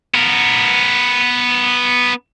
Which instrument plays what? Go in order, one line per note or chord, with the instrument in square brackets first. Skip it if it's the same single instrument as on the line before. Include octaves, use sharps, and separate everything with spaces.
[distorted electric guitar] B3 A#4